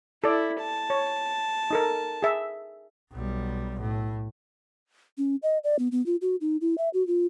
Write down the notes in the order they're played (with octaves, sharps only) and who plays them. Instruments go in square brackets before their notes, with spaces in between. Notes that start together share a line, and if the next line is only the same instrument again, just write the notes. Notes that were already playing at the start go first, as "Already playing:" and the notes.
[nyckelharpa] E4 [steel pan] A4 D5
[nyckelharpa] A5
[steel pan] C#5
D#4 A4 A#4
G#4 E5
[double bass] B1 G3
A2
[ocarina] C#4
D#5
D5
B3
B3
F4
F#4
D#4
E4
E5
F#4
F4